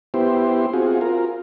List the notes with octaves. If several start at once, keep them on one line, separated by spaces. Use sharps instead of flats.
B3 E4 G4 C5
C4 F4 F#4 G#4
F4 A#4